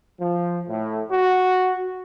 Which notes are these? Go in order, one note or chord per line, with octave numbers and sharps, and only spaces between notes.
F3
A2
F#4